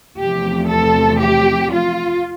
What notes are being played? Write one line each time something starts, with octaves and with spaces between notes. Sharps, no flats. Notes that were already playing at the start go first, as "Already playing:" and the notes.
E2 C3 F3 A3 G4
A4
G4
F4